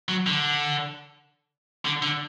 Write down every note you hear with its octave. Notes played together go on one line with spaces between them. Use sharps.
F#3
D3
D3
D3